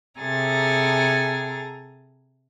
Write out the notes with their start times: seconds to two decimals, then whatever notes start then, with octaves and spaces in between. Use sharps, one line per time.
0.20 C3 G#4 A4 G#5 A#5 A6